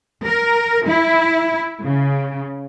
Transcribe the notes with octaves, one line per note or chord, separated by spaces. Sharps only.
A#4
E4
C#3